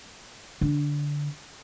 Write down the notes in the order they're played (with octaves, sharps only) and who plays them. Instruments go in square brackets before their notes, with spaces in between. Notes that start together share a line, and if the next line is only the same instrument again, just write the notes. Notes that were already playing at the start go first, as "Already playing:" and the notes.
[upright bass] D3